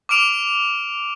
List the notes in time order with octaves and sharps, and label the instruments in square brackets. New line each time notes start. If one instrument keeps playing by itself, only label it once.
[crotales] D6 F6 D7 F7